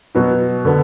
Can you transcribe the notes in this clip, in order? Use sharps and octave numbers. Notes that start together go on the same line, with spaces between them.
B2 F#3 B3 F#4
D3 B3